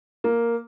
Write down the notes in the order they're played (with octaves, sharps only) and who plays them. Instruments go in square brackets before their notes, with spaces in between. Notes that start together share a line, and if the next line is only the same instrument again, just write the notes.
[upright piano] A#3